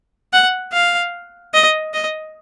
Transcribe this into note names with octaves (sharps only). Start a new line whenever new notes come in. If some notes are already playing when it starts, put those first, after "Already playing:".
F#5
F5
D#5
D#5